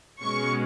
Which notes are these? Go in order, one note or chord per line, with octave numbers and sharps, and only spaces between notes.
B2 G#3 C#4 C#6